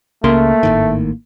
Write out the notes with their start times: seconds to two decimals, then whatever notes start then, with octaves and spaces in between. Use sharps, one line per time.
0.24 C#2 C#3 A3 A#3 A#4 C6
0.63 G#1 A2 D#3